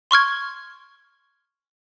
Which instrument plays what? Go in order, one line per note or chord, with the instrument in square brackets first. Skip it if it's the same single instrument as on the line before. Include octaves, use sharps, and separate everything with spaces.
[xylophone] C6 C#6 F6 G#6